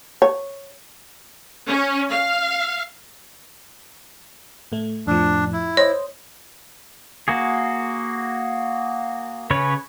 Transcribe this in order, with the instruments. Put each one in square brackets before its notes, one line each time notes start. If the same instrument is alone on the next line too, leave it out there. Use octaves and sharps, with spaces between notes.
[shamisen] C#5
[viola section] C#4
F5
[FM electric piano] A2 A3
[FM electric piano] F2 A2 F3 [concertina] D4
[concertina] E4
[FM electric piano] C5 D#5 [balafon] C#5
[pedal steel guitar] A#3 F#4 G#4
C#3 C#4 B4 C#5